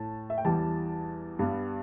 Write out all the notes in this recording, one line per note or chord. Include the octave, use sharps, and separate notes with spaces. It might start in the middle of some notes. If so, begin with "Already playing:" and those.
Already playing: A2 A5
E5
G5
E2 E3 G3 A5
G2 G3 B3